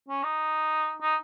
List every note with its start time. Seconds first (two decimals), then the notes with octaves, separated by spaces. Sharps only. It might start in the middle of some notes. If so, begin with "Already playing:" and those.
0.08 C#4
0.23 D#4
1.02 D#4